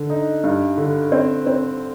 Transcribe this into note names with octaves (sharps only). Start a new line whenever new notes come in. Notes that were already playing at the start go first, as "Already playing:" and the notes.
Already playing: D3
D#4
G2
D3
C4
C4